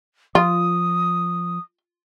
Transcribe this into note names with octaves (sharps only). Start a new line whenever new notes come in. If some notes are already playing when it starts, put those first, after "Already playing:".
F3 F4 D#6